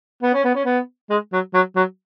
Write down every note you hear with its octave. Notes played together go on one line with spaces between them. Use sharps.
B3
C#4
B3
C#4
B3
G#3
F#3
F#3
F#3